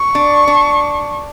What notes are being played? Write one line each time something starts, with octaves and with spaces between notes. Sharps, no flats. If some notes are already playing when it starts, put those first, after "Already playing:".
Already playing: C#6
D4
D4